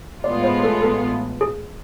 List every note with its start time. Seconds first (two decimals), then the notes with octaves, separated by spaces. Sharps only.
0.24 A1 A2 G#3 B3 F4 D5
0.44 C5
0.63 A4
0.82 A4
1.41 G#4